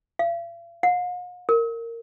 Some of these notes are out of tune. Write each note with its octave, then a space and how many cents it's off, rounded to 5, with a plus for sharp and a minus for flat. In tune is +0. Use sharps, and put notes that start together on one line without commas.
F5 -45
F5 +45
A#4 -15